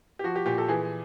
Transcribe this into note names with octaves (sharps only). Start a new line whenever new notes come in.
G4
F3 F#4
G4
A#2 G4
A4
E3 G#4